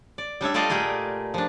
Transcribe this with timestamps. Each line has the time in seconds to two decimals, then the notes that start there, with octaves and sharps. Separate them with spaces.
0.18 D5
0.41 G3 D4 C#5 E5
0.54 G3 A3 F4 D5 D#5 F5
0.70 A#2 A3 G4 G#4 A#4
1.34 F3 D4